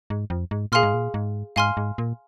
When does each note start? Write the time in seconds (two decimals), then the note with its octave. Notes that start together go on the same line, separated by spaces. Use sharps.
0.10 G#2
0.30 F2
0.51 G#2
0.72 A#2 G#4 F5 G#5 C6 F6
0.83 G#2
0.94 A#2
1.14 G#2
1.56 G#2 F5 G#5 C6 F6
1.77 G#2
1.98 A#2